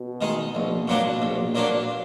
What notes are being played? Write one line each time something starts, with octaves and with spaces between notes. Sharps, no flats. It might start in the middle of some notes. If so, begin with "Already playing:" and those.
Already playing: B2
D#3 G#3 D#4
A#1
A#2 F#3 A#3 D4
A#1
A#2 F#3 A#3 D4